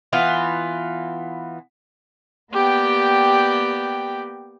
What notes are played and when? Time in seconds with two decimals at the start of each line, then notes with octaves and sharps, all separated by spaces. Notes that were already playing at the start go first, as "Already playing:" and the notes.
0.13 E3 B3 F4
2.52 A#3 B3 G4 D5 G5